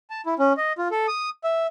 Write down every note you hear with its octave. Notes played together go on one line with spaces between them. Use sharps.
A5
E4
C#4
D#5
F4
A4
D#6
E5